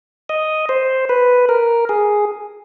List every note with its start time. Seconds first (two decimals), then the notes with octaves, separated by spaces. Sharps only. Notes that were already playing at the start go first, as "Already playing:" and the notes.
0.29 D#5
0.69 C5
1.09 B4
1.49 A#4
1.89 G#4